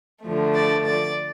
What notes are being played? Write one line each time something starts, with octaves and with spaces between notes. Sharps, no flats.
D3 F3 A3
D5
D5